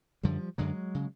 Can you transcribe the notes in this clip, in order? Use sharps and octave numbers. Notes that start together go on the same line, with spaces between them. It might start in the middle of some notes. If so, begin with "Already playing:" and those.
F#2 D3 F3 G3
F#2 D3 F#3 G#3
C#3